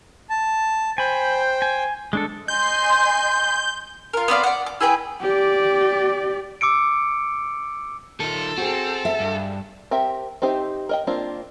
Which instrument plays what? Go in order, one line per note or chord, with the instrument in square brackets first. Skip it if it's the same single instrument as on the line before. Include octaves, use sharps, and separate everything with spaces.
[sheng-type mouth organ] A5
[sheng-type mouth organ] C5 G5 [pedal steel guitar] G#5 B5
[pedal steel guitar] G#5
G#3 D4 A4
[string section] D#5 G#5 C6 [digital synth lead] G6
[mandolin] F4 A#4
B3 C4 D5 F5
D5 F#5
D6
E4 G#4 B4 G5
[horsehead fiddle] G4 D5
[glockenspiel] D6 E6 C#7 D7
[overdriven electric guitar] D#3 F4 [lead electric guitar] A4
[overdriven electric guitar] C4 [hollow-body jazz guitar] F#4 G#4
[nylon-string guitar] E5
[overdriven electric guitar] G2
[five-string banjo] C4 G4 A#4 E5
C4 D#4 G4 C5 E5
A#4 D#5 G5
A#3 C4 D4 F4